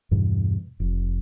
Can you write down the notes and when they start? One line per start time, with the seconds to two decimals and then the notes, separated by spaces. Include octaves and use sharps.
0.11 E2 G2 B2 G3
0.80 F1